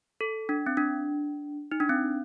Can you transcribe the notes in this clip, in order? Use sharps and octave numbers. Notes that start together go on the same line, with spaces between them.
A4
D4
C4
D4
D#4
D4
C4